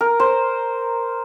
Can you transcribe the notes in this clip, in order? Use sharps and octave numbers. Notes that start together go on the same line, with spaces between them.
A#4
C5